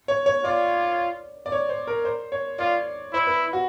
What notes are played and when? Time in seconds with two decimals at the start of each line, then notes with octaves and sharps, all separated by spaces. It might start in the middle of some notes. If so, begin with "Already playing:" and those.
0.08 C#5
0.26 C#5
0.44 F4 D5
1.46 D5
1.52 C#5
1.69 C5
1.87 A#4
2.05 C5
2.32 C#5
2.59 F4 D5
3.14 E4 C5
3.27 B4
3.53 F#4